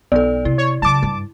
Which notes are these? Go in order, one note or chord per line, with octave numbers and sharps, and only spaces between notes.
B1 B3 A4 D5
C3 E4
C#5
C#3 F#3 A5 D6
G2